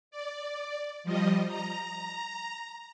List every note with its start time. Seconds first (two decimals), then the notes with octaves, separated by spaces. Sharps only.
0.11 D5
1.04 F3 G3 D#5
1.48 A#5